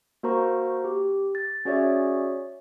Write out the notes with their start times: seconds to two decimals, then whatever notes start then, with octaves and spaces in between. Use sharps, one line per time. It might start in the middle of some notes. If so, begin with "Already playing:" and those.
0.23 A#3 F#4 A#4 C5 A#5 C#6
0.84 G4
1.35 A6
1.65 C#4 F#4 G#4 C#5 D5 E5